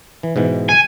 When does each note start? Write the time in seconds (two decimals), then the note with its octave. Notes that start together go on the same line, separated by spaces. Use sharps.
0.23 E3
0.36 G#2 B2 E3
0.69 G#5